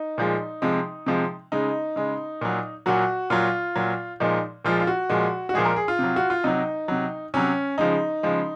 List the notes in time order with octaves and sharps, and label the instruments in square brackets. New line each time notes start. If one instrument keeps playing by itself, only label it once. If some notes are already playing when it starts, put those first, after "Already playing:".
Already playing: [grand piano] D#4
A#2 F3 G#3
C3 F3 G#3
C3 F3 G#3
C#3 G#3 D#4
C#3 G#3
A#2 F#3
A#2 F#3 F#4
A#2 F#3 F4
A#2 F#3
A#2 F3 G#3 D#4
A#2 F3 G#3 F4
F4
F#4
A#2 F3 G#3
F#4
A#2 F3 G#3 G#4
A#4
G#4
F4
C3 F#3
F#4
F4
C3 F#3 D#4
C3 F#3
C3 F#3 C#4
C#3 F3 G#3 D#4
C#3 F3 G#3